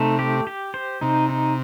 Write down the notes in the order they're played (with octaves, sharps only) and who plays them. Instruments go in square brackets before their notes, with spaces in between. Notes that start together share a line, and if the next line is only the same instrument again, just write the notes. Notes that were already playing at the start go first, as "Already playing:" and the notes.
Already playing: [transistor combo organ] C3 [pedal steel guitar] A3 D#4
[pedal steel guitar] G4
G4
C5
[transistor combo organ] C3 [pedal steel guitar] D#4
[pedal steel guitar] D#4